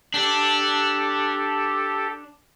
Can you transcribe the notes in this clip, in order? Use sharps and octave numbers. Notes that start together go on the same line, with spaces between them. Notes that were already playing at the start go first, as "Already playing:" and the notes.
D4 G4 A4